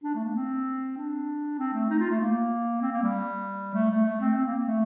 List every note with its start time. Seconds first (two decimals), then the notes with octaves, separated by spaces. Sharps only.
0.03 D4
0.15 A3
0.24 A#3
0.35 C4
0.97 D4
1.58 C4
1.73 A3
1.90 D#4
1.99 F4
2.09 A3
2.20 A#3
2.81 C4
2.92 A#3
3.03 G3
3.74 A3
3.90 A3
4.06 A3
4.20 C4
4.37 C4
4.46 A#3
4.67 A3